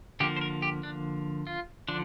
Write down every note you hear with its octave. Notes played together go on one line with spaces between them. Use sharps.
D3 F3 A#3 G4
C5
A#4
G4
D4
F4
D3 F3 D4